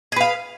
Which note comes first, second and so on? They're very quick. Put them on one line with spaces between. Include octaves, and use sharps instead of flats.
G#4 B4 F5